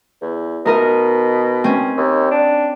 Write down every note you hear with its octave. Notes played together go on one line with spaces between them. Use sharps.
E2
B2 D#4 A#4 D#5
C4 C#4
D#2
D4